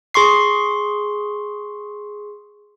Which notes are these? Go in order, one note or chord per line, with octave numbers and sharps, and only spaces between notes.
G#4 C6 C#6 C7